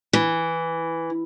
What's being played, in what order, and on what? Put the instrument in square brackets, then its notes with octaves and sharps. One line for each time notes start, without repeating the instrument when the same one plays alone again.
[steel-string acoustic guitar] E3